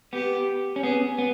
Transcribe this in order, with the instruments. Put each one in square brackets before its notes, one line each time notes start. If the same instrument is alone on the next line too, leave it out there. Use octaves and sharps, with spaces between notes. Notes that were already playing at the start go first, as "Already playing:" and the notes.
[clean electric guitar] B3 [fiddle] G4
[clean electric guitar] C#4
[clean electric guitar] B3 [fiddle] G#4
[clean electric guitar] B3